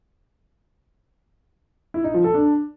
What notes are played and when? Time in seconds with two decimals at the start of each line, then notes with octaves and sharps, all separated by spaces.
1.94 E4
2.04 D#4
2.14 F3
2.24 A4
2.34 D4